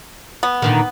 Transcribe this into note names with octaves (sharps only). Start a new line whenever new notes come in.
B3
A#2 D3 D#3